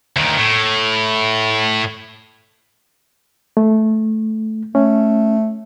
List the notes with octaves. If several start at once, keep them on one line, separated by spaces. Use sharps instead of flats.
D2 D#3
A2
A3
A3 C#4